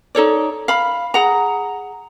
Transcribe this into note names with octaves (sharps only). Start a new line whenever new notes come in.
D#4 A4 C#5 D5
F5 B5
G#4 F#5 A#5